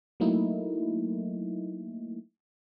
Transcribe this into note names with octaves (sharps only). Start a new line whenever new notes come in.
F#3 A3 A#3 D#4 E4